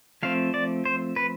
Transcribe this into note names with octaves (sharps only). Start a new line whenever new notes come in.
F3 A3 C4 F5
D5
C5
B4